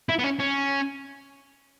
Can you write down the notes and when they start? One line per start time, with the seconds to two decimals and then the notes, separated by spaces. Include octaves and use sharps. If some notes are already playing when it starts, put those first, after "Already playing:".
0.09 E4
0.19 B3
0.24 C#4
0.39 C#4